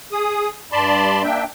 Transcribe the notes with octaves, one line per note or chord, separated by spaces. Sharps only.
G#4 D#6
G2 D5 A5 B5 C6
A#3 D4 E5 G5